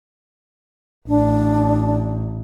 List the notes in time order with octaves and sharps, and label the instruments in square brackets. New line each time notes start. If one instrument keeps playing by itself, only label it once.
[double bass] A1 [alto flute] D4